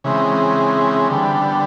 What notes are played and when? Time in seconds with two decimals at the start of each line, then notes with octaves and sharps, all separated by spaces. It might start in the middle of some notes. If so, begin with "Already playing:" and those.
0.04 C#3 E3 G#3 C4
1.09 D3 G3 B3